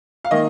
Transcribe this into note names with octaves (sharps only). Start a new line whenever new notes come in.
F5
D#3 A#3 D#5